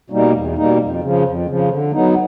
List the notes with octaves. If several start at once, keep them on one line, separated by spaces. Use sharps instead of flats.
B2 G3 A#3 D#4
E2
B2 G3 A#3 D#4
F2
C#3 F3
F2
C#3 F3
D3
F#3 B3 D#4